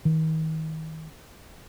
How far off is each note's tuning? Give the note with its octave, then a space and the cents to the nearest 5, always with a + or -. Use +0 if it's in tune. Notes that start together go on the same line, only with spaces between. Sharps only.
D#3 +35